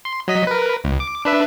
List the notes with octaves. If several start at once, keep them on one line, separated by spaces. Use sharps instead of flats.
C6
F#3 D#5 B6
A#4 B4
C#2
D6
D4 B4 E5